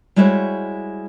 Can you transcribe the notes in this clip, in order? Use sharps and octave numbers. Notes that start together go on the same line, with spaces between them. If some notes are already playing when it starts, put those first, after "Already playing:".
G3 G#3 E4 F#4 C5 C#5